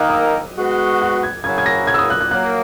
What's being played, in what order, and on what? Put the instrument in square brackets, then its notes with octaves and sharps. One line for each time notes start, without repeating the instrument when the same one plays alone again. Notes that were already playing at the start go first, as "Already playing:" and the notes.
Already playing: [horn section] D#3 A#3 D#4 A#4 [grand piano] F#6
[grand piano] D#6
E6
[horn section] G#3 B3 F#4
[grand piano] F#6
G#6
[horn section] C#3 F#3 C#4 E4 A#4 [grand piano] G#6
[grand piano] G#6
A#6
G#6
E6
D#6
F#6
F#6
[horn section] F#3 A#3 [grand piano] F#6